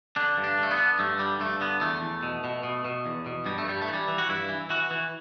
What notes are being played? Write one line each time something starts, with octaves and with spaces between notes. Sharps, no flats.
D3 D4
G2
D4
D3 A3
B3
D3
G2 A3
D3 G3
G2 A3
D3 B3
E2 A3
E2
B2
B2
B2
B2
E2
B2
G2 G3
A3
G2 G3
A3
E3
G3
E3
F#4
G2 E4
E3
E3 F#4
E3